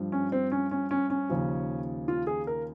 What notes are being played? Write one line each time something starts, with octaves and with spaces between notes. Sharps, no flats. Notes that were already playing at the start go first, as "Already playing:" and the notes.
Already playing: G2 F3
C#4
C4
C#4
C#4
C#4
C#4
D#2 C#3 F3
F4
G#4
A#4